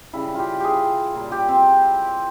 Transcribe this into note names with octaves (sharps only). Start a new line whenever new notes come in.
C#3 G3 E4
F4
G4
G4 G#4
A#2 G3
G4
C4